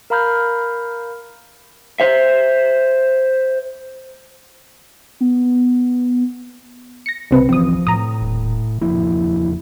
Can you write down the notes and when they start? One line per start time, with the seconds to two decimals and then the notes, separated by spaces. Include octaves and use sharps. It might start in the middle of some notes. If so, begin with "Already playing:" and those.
0.10 A#4 F5 A#5 B5 F6 G6
2.00 C5 E5
5.21 B3
7.06 A#6 C#7
7.31 C2 C#3 C4 B4
7.49 G1 E3 F3 C4 D#6
7.87 A2 A#5 D#6
8.21 D#1
8.81 E1 F3 A#3 E4